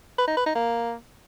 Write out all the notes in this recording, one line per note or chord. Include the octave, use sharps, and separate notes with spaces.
B4
D#4
B4
D#4
A#3